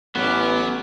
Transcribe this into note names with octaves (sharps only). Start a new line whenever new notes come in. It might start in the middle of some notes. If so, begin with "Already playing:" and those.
A1 F#3 B3 C#4 D6